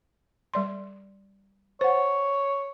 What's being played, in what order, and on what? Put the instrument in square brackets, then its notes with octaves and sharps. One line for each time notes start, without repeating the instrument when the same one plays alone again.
[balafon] G3 D5 C6
[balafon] C5 F#5 [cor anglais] C#5